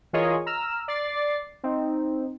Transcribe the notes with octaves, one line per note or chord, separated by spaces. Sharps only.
E3 F4 G#4 A#4 C#5 D#5
A#5 E6 F6
D5 A6 C7
C4 D#4